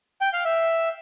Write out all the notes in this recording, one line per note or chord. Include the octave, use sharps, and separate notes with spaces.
G5
F5
E5